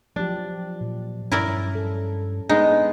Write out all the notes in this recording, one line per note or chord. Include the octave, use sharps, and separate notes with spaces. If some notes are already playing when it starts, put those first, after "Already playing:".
F3 F#3 D4 G4
A#2
G2 C#4 E4 A#4 D5
A4
G#3 B3 D4 D#4